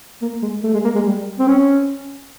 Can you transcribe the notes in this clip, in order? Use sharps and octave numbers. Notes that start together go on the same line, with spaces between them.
A#3
G#3
A3
G#3
A#3
G#3
G3
C4
C#4